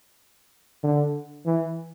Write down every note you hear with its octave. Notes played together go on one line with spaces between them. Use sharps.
D3
E3